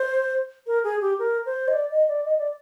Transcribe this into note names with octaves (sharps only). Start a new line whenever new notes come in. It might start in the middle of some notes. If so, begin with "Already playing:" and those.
Already playing: C5
A#4
G#4
G4
A#4
C5
D#5
D5
D#5
D5
D#5
D5